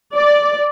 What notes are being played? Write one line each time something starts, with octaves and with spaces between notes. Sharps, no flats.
D5